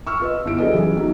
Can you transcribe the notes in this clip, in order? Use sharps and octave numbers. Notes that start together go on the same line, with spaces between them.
C#6 E6 F6
F4 B4 D#5
G1 E4 D7
F#3 D4 G#4 A4 B4 D#5
C#3 E3 F#3 G3
F#3 D#4